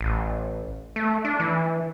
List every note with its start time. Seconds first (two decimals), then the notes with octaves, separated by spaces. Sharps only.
0.01 A1
0.96 A3
1.25 D4
1.40 E3